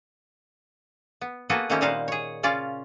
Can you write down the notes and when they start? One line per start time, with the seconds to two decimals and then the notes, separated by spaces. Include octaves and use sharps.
1.21 B3
1.50 A#3 B3 F#4 G#4 A4 B4
1.70 D#3 A3 A#3 C4 C#4 G4
1.81 A#2 G3 D#4 C5 F5 F#5
2.08 G#4 C#5
2.43 C#3 C#4 F4 D5